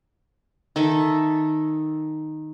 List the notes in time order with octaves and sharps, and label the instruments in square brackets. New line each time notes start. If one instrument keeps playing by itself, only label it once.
[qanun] D#3 A4 E5